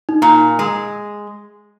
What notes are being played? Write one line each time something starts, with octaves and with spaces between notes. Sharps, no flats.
D#4
A#2
G#3